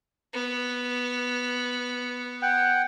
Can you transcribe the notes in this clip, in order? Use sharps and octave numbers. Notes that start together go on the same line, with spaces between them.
B3
F#5 G5